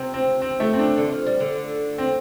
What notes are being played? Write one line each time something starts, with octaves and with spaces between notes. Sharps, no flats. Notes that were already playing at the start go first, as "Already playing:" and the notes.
Already playing: C3 C4
C4
C4
A3
C4
D4
D3
F3
G3
D3
C4